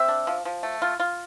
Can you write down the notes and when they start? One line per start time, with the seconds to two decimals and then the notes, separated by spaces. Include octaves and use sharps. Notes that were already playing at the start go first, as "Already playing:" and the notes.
Already playing: C4 E5
0.08 D4
0.27 F3
0.45 F3
0.63 A3
0.82 F4
1.00 F4